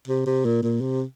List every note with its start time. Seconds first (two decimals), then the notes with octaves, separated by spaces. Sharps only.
0.07 C3
0.26 C3
0.45 A#2
0.63 A#2
0.81 C3